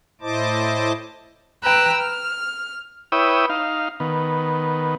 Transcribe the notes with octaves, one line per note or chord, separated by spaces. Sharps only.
A2 E4 C5 D#5 A5 D6
B4 G5 A#5 E6 F#6
F6
E4 B4 C#5 G5 D#6 E6
D#4 F5
D#3 B3